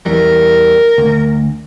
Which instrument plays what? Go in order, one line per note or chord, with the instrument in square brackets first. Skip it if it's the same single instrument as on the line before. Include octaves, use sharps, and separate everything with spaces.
[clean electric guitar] E2 E3 G3 [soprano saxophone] A#4
[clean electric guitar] D2